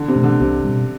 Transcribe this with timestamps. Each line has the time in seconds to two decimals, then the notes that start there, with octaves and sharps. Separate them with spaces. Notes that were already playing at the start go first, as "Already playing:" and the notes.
Already playing: D3
0.08 C3
0.15 B2 A3 C4
0.24 D3
0.40 C2 C3
0.64 B2 G3